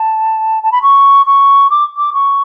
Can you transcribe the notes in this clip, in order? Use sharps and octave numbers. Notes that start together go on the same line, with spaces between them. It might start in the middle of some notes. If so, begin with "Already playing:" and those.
Already playing: A5
A5
B5
C#6
C#6
D6
D6
C#6